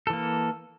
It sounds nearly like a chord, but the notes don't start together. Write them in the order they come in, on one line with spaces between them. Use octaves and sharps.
A4 E3 A#3